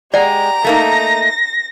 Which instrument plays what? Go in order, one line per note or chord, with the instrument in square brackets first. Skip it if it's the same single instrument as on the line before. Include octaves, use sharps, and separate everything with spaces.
[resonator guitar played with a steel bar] G#3 [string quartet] G4 [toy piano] D5 F#5 [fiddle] A#5
[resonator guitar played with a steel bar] A3 A#3 D#4 [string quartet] A#6